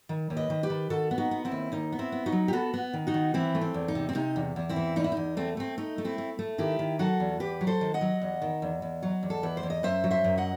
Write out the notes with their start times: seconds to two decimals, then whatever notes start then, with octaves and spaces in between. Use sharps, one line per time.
0.09 D#3
0.30 D#2
0.37 B4 D#5
0.50 D#3
0.63 G4 B4
0.70 D#3
0.90 D#3 F#4 A4
1.11 B3
1.18 D#4 F#4
1.31 B3
1.45 C4 E4
1.52 D#2
1.72 D#2 D#4
1.92 B3
1.99 C4 E4
2.12 B3
2.26 D#4 F#4
2.32 F#3
2.48 G4
2.53 B3 F#4 A4
2.74 B3
2.93 D#3
3.07 D#4 F#4
3.14 D#3
3.34 E3 C4 E4
3.55 A3
3.61 C4
3.74 E2
3.88 D#4
3.95 C3
4.09 C4
4.15 C3 D#4
4.36 E2
4.56 E2
4.69 C4 E4
4.76 E3
4.96 E2 D#4
5.04 E4
5.12 E2 D#4
5.37 A3 C4
5.57 A3 C4
5.78 A3 D#4
5.98 A3
6.05 C4 E4
6.18 A3
6.39 A3
6.58 D#3 E4 G4
6.79 D#3
6.99 F#3 F#4 A4
7.20 E2
7.40 E2 G4 B4
7.61 F#3
7.67 A4 C5
7.81 D#3
7.94 D#5 F#5
8.01 F#3
8.22 E2
8.42 D#3
8.62 E2
8.82 E2
9.03 F#3
9.23 E2
9.30 A4
9.43 E2 B4
9.57 C5
9.63 E2
9.70 D#5
9.83 F#2 C5 E5
10.04 F#3
10.11 C5 E5
10.24 F#2
10.37 D#5 F#5